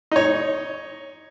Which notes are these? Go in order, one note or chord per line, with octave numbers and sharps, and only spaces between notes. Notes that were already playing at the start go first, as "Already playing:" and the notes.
D#4 C#5